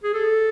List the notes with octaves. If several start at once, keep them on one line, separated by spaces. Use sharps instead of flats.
G#4
A4